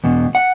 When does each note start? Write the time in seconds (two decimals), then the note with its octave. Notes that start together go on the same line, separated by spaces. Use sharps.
0.04 E2 B2
0.35 F#5